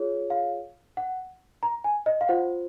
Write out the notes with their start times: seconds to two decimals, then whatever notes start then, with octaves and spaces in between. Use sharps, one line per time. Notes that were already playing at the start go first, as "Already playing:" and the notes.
Already playing: F4 G#4 C#5
0.30 F5
0.97 F#5
1.63 A#5
1.84 G#5
2.06 D#5
2.21 F5
2.28 F4 C5 F#5